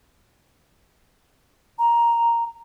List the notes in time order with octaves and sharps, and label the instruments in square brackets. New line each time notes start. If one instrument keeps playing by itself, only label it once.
[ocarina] A#5